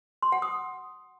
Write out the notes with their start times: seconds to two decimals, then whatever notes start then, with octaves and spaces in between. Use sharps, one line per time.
0.22 C6
0.32 F#5
0.42 D#6